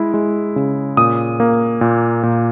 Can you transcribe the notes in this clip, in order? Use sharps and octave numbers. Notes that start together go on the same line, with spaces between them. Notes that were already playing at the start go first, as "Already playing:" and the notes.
Already playing: G#3 E4
G#3
C#3
A#2 D#6
A#3
A#2
A#2